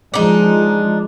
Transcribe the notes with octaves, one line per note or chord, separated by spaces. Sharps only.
F3 G#3 D4 D#4